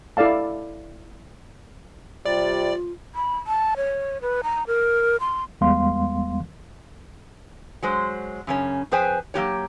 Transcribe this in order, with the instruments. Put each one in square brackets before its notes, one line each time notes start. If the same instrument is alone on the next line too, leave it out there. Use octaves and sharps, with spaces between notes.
[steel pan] E4 A4 D5 F5 A5
[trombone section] C3 G3 [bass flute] F4 [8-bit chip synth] D5
[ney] B5
A5
C#5
B4
A#5
A#4
C6
[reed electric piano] E2 G3 G#3 B3 F5 C6
[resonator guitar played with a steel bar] F#3 G#3 C5
F#2 C#3 C#4
F2 G#4 B4 C5 G5 G#5
F#3 A#3 G4 C#5